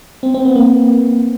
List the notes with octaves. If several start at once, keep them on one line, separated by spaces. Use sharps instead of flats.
C4
C4
B3
A#3